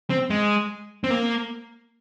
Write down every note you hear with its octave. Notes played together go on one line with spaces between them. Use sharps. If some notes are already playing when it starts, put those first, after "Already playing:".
C4
G#3
C4
A#3